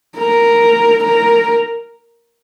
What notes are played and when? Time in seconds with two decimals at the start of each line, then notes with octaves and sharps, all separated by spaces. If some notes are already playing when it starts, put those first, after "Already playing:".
0.17 A#4
1.04 A#4